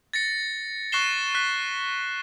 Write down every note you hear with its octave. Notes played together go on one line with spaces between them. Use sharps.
A6 A#6 C#7
C#6 F#6 A#6 C7 E7 G7
F#6 B6